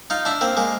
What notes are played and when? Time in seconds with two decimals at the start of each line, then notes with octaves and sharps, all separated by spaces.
0.10 D#4 F4
0.25 D4 E4
0.41 A#3 C4
0.57 G#3 A#3